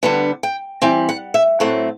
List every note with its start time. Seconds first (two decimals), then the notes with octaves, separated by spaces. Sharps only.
0.03 D3 G3 B3 D4 F#5
0.43 G5
0.82 E3 G3 C4 G5
1.09 F#5
1.34 E5
1.60 A2 F#3 A3 C4 F#5